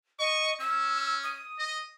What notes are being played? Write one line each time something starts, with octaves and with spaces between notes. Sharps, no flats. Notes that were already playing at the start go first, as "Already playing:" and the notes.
D#5 C#6
C#4 E6
D#6
D#5